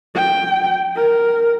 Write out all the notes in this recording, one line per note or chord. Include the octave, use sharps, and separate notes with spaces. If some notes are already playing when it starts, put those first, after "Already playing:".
G5
A#4